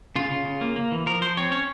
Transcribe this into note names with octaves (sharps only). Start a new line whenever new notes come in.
C#3 F4
C#3
C#3
A#3
A#3
E3
F3 A#4
F3 C5
C4 C#5
C#4 C#5